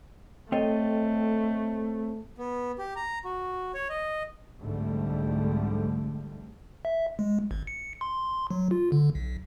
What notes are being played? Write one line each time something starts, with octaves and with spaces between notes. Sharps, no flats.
A3 C4 A4 C#5 D#5 G5
B3
G4
A#5
F#4
C#5
D#5
C2 F2 G#2 D3 G3 A3
E5
G#3
G#1
C#7
C6
F#3
F4
D3
B1